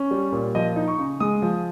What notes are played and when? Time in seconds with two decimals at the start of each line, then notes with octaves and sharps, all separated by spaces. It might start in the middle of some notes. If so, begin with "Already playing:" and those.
Already playing: C#4
0.11 G3
0.32 A#2
0.55 F3 D#5
0.76 D#4
0.88 C#6
0.98 C#3
1.20 G#3 D#6
1.42 F3